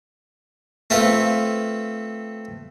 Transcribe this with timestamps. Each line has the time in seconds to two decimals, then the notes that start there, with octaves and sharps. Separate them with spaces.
0.90 A3 C4 F4 A4 B4